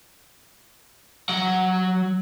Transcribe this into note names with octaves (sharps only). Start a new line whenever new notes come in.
F#3 F#5